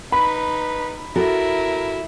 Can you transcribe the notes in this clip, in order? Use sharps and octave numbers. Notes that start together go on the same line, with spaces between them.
D#4 B4 B5
E4 F#4 A4 A#4